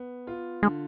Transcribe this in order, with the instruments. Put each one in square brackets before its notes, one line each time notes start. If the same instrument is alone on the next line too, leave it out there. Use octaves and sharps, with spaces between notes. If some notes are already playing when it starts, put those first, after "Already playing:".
Already playing: [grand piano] B3
F4
[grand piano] D3 [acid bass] G#3